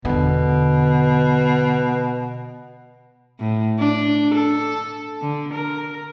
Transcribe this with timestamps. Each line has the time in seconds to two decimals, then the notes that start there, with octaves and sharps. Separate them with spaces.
0.05 E2 B2 D3
3.40 A2
3.79 D4
4.35 A4
5.22 D3
5.53 A#4